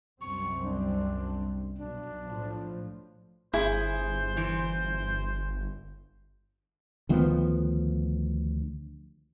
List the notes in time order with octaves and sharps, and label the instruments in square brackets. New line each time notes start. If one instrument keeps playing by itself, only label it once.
[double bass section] C2 F#2 C4 [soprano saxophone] C#6
[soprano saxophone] D4
[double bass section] B1 [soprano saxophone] D4
[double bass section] A2 F3
[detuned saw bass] G1 [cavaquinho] E4 [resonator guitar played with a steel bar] G#4 [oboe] C5
[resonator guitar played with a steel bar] E3
[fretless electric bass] D2 D#3 F3 B3